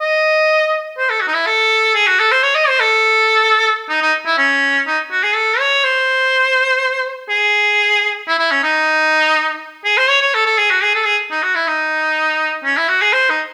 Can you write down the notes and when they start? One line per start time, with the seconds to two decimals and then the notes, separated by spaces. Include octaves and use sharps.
0.01 D#5
0.98 C5
1.09 A4
1.21 F#4
1.27 D#4
1.34 E4
1.46 A4
1.95 G#4
2.07 F#4
2.20 A4
2.32 C5
2.43 C#5
2.55 D#5
2.68 C5
2.80 A4
3.89 D#4
4.02 D#4
4.26 E4
4.38 C#4
4.87 D#4
5.11 F#4
5.23 G#4
5.35 A4
5.59 C#5
5.84 C5
7.30 G#4
8.27 E4
8.39 E4
8.51 C#4
8.63 D#4
9.85 G#4
9.98 C5
10.09 C#5
10.21 C#5
10.34 A4
10.46 A4
10.58 G#4
10.71 F#4
10.83 G#4
10.95 A4
11.06 G#4
11.31 D#4
11.43 F#4
11.55 E4
11.67 D#4
12.64 C#4
12.77 E4
12.88 F#4
13.02 G#4
13.13 C5
13.30 D#4